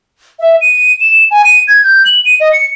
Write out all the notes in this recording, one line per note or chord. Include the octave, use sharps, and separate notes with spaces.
E5
D#7
E7
G#5
D#7
G#6
G6
F#7
D#7
D#5
C#7